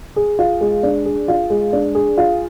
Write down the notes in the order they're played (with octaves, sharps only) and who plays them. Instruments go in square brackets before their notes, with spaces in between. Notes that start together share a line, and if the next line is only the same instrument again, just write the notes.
[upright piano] G#4
F4
G#3
D4
G#4
F4
G#3
D4
G#4
F4